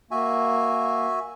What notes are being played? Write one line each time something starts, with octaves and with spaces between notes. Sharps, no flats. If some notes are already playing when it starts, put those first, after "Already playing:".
A#3 F#4 E5 G#5